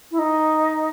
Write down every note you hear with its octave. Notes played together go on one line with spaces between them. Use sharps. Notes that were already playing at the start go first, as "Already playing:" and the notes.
E4
D#4